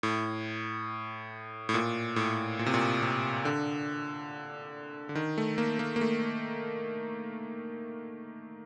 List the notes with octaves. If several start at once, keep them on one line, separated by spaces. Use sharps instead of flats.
A2
A2
A#2
A2
A#2
C3
A#2
C3
D3
D3
D#3
A3
A#3
A#3
A#3
A3